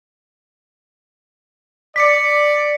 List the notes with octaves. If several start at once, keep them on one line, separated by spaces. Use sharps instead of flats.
D5 B6 C#7